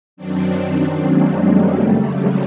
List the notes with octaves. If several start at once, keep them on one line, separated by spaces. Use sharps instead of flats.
F#2 D#3 F#3 C4 D4
G#3 A#3
G3 A3
F2 C#3 F#3
G#3